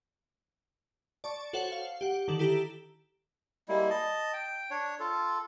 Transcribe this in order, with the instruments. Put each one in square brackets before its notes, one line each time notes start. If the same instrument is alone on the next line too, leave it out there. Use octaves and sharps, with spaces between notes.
[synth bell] D5 A5 C#6
F#4 A4 C5 C#5 F#5
F5
G4 F#5
D3 D#3 A4 F#7
E4 G4 A4 A#5
[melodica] G3 G#3 A#3 E4
D#5 A5
G5
D4 C#5
F4 A4